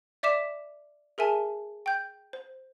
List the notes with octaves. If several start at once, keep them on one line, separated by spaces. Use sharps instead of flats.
D5 E5 D6 B6 E7
G#4 A#4 E5 G#5 A5
G5 G6
C5